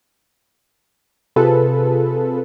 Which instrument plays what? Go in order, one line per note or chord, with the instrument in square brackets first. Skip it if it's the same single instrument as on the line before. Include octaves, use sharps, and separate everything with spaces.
[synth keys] C3 F4 G#4 A4 B4